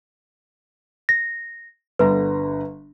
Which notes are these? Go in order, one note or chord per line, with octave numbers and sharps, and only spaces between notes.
A#6
G1 D3 B4 A#5